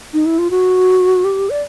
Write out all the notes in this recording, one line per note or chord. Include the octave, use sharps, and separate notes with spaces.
D#4
E4
F4
F#4
G4
D5